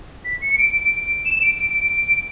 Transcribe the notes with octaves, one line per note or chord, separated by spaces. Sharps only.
B6
C#7
C#7
D7
D7
D7
E7
E7
D7
D7
D7
D7